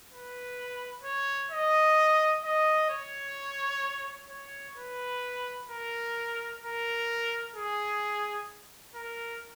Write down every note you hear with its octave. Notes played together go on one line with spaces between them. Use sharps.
B4
C#5
D#5
D#5
C#5
C#5
B4
A#4
A#4
G#4
A#4